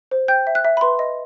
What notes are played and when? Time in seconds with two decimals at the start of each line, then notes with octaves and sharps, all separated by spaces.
0.11 C5
0.28 G5 G6
0.47 E5
0.55 F#6
0.65 E5
0.77 B5
0.81 B4 C6
0.99 D#5